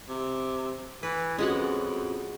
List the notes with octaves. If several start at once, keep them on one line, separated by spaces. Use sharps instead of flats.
C3
E3 B4
F2 G#3 B3 C#4 F4 F#4 F#5